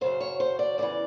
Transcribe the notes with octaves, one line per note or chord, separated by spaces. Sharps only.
F#2 C#3 F#3 C5
C#5
C5
D5
E2 C#3 E3 D5